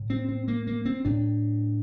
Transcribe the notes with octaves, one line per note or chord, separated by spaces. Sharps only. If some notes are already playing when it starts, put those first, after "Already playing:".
Already playing: A2
C4
C4
A#3
A#3
C4
A2 D4